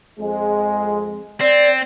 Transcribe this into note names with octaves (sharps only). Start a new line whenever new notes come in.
F2 G#3
C4 D5